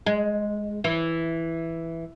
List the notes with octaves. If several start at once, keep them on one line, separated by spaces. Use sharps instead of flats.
G#3
E3